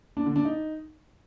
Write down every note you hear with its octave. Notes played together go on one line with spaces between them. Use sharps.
D4
D3
D4
D#4